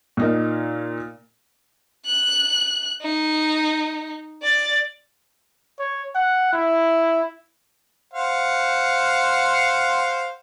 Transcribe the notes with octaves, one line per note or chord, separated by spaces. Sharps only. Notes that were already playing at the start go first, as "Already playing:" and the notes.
A#2 D#4 A#4
F#6
D#4
D5 A6
C#5
F#5
E4
C5 F5 F#5